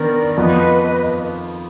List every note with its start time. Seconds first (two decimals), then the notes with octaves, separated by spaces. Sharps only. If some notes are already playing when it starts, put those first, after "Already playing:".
Already playing: D#3 B3 D4 A#4 D5
0.36 F2 F3 B3 B4 D#5